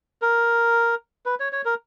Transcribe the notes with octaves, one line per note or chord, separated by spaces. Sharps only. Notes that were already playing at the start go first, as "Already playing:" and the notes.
A#4
B4
C#5
C#5
A#4